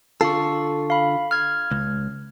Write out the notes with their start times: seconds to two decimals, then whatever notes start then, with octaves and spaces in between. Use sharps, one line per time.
0.21 D3 F4 A4 C#6 C7
0.90 F5 B5
1.31 F6 G#6
1.71 C#2